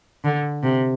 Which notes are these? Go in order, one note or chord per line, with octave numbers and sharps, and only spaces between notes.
D3
C3